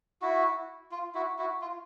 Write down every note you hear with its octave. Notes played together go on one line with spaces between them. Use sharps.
E4 F#4
F4
E4 F#4
E4 F#4
F4